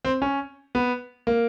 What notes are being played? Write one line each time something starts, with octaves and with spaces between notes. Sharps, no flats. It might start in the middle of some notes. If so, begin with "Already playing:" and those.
C4
C#4
B3
A#3